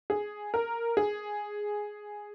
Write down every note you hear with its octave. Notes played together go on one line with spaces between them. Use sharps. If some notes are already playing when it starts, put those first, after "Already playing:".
G#4
A#4
G#4